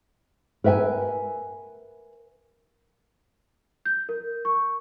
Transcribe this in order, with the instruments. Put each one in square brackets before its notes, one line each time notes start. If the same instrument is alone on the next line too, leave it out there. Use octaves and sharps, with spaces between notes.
[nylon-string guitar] A#4 B4 E5 G5 G#5
[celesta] G6
A#4
C#6